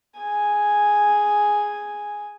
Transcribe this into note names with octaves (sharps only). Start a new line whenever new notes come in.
G#4 G#5